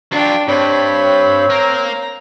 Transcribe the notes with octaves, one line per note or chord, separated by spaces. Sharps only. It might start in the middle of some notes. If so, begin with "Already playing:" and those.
F#3 D4 F4 G5
G2 C4 C#5 B5
A#3 A#5